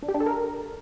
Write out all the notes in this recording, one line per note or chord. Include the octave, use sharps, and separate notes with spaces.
D4
G4
D4
A4
A#4